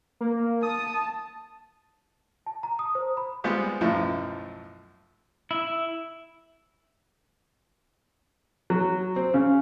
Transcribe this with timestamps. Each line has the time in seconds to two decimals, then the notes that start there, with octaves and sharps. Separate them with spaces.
0.21 A#3
0.63 A5 D#6
2.46 A5
2.63 A#5
2.79 D#6
2.95 C5
3.17 B5
3.44 G3 G#3 B3 C4 F4 G4
3.81 B1 F#2 A2 F3
5.51 E4
8.70 F#3
9.16 C4
9.34 C#3